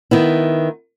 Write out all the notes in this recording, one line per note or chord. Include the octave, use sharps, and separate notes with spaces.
D#3 B3 E4